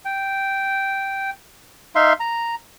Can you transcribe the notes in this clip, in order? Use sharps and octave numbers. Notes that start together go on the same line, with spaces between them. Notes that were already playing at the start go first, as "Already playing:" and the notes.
G5
D#4 E5 F5 C6
A#5